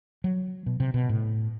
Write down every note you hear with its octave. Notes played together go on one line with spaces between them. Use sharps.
F#3
B2
C3
B2
A2